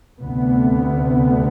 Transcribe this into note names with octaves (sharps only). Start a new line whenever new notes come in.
D2 C3 B3